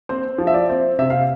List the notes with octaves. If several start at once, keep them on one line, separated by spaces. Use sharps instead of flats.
C4 C5
F3
E5
D5
C4
C3 E5
F5